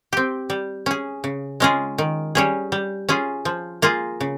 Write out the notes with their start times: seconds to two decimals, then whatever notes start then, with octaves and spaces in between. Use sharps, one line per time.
0.13 C4 G4
0.50 G3
0.86 C#4 G#4
1.24 C#3
1.60 G#3 C#4 F4 G#4
1.98 D#3
2.35 G3 C#4 G#4
2.72 G3
3.09 C#4 F4 G#4
3.45 F3
3.82 A#3 F4 G#4
4.21 C#3